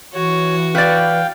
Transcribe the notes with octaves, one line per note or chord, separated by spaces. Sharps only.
E3 F#4 C#5
B4 D5 F5 G5